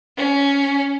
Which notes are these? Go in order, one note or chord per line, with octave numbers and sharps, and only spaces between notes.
C#4